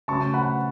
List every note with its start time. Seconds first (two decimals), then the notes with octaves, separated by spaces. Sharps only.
0.08 C#3 F#3 A3 C#4 A5 C#6
0.34 F#5 B5